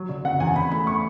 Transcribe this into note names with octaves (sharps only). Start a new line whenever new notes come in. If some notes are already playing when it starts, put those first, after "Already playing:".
Already playing: F#3
D3
F#1 F#5
E2 G#5
E2 B5
A3 B5
C#6